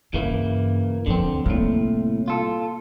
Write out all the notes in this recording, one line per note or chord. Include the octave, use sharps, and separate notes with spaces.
G2 C#3 E3 A#3
D2 D3 F3 C4
C2 A2 A#3
F4 A4